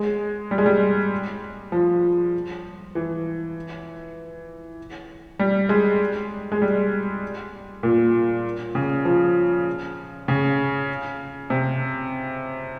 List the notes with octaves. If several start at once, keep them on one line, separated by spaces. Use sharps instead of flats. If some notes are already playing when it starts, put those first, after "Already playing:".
Already playing: G#3
G3
G#3
G3
F3
E3
G3
G#3
G#3
G3
A#2
C#3
F3
C#3
C3